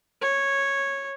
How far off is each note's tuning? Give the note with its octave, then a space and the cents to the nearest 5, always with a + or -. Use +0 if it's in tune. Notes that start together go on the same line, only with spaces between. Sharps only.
C#5 -10